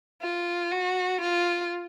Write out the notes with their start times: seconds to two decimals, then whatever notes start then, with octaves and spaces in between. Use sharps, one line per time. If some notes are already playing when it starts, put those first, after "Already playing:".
0.22 F4
0.72 F#4
1.21 F4